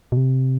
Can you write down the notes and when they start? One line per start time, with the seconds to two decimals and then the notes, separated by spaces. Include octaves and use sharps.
0.12 B2
0.17 C3